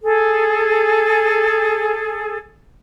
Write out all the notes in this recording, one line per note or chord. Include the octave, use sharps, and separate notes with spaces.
G#4 A4